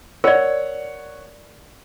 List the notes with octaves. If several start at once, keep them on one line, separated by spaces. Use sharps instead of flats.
A#4 C#5 D5 F#5